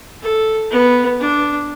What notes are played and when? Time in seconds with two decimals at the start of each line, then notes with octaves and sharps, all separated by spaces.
0.22 A4
0.71 B3
1.20 D4